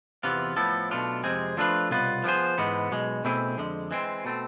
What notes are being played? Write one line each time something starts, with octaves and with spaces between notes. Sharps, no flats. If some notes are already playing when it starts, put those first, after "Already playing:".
E2 C3 E3 B3 F4
A2 F3 B3 E4 A4
B1 B2 A3 D4 F4
F2 C3 G#3 C4 G#4
F3 A3 D4 F4 B4
C2 B2 B3 F4 B4
F3 B3 E4 G#4 C5
G#2 E3 G#3 B3
B1 B2 G#3
B2 A3 C4 E4 G#4
F2 D3 G#3
E3 G#3 C4
B2 A3 C4